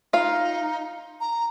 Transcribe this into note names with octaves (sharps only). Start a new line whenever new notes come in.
D#4 F4 F5
A#5